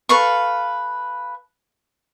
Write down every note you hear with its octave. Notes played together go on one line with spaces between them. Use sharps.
A4 B4 F5 C#6